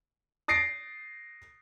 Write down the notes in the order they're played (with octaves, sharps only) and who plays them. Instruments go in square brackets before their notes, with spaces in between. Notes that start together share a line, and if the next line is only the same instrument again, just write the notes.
[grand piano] D#6 A6 A#6 C7 D7